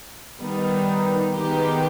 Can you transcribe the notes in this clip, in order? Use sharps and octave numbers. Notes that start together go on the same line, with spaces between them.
D#3 G3 B3 D#4
D#3 G#3 B3 D#4 G4